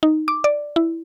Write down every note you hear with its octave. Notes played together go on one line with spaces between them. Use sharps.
D#4
D6
D5
E4